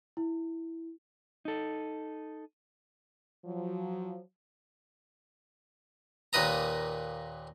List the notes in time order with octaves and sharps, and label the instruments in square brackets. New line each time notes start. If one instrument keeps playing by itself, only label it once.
[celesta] E4
[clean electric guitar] D#4 A4
[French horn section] F3 F#3
[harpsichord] D#2 A#2 B4 D#5 A#5